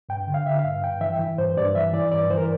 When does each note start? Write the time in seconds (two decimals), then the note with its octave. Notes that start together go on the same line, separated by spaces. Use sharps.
0.09 G2 G5
0.27 D3
0.34 F5
0.46 D3 E5
0.59 G2 F5
0.83 G2 G5
1.01 E3 E5
1.19 E3
1.38 G2 C5
1.57 G2 D5
1.75 E3 E5
1.93 E3 D5
2.12 G2 D5
2.30 E3 C5
2.37 A#4